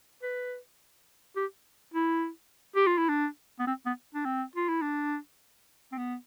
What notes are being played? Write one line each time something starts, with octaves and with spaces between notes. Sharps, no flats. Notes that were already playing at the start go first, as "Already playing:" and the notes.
B4
G4
E4
G4
F4
E4
D4
B3
C4
B3
D4
C4
F4
E4
D4
C4
B3